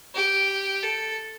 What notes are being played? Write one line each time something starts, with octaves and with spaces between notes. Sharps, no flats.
G4
A4